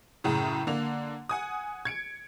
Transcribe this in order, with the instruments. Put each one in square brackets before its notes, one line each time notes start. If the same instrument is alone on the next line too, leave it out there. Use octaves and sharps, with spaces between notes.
[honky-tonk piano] F#2 A2 C#3
D3 A#3 F7
F#5 G#5 D#6
G#6 C#7 D7